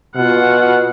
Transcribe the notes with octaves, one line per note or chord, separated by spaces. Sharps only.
B2 F4 F#5